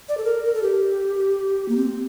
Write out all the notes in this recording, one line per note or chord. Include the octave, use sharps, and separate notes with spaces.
D5
A4
A#4
A#4
A4
G4
A#3
C4